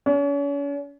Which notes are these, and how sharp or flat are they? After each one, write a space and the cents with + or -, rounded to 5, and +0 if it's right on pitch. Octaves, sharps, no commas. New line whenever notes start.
C#4 +40